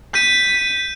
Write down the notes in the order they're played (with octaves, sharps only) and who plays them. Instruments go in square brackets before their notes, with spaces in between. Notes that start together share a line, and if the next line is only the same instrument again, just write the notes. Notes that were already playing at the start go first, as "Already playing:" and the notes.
[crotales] G6 D#7 [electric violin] B6